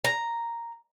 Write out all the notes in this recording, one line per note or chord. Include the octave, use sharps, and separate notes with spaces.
A#5